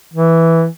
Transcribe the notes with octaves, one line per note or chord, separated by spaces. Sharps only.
E3